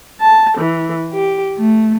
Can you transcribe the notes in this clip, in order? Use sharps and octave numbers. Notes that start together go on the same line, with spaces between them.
A5
E3
G4
A3